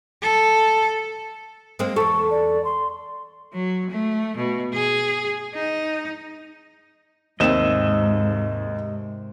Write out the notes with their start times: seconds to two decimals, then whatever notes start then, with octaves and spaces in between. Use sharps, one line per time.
0.22 A4
1.79 G#3 A#3 C4
1.96 E2 A4 C#6
2.31 D5
2.65 C6
3.53 F#3
3.90 A3
4.37 B2
4.73 G#4
5.55 D#4
7.40 D#2 G#2 C3 G4 D#5 E5 E7